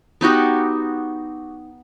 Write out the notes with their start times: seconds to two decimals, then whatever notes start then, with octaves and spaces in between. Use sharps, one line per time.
0.21 B3 D#4 F#4 G4